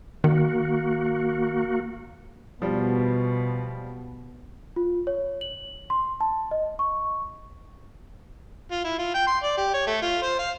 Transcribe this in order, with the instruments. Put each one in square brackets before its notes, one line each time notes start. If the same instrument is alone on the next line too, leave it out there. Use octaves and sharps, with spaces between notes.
[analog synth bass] D#3 [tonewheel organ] A#3 F#4
[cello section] B2 [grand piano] F3 G3
[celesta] F4
C#5
F#7
C6
A5
D#5
C#6
[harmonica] F4
E4
F4
G5
C6
D5
G4
C#5
A3
F4
C5
F5